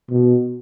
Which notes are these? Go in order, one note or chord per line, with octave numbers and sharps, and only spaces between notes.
B2